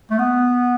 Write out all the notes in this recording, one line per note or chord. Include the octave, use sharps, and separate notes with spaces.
A3
B3